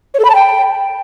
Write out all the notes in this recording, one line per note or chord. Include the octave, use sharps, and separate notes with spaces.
C#5
A4
B5
A5
G5